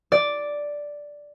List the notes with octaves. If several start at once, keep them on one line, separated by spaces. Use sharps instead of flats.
D5